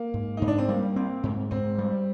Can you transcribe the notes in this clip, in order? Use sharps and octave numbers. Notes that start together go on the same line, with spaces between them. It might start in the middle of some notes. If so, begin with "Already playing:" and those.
Already playing: A#3
G#2
G#2 D#4
D4
C4
G3 A#3
C4
G#2
G#2 C4
G3